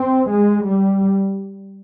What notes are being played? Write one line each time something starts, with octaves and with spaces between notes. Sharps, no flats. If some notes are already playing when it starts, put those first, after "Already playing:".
Already playing: C4
G#3
G3